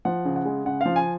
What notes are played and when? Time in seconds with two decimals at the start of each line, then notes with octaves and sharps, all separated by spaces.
0.05 F3 F#5
0.25 C#3
0.36 F#5
0.45 G#3
0.65 C#3 F#5
0.81 F3 F5
0.96 G#5